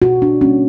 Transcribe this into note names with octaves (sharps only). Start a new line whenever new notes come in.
B2 F#4
D4
G3 A#3 C#4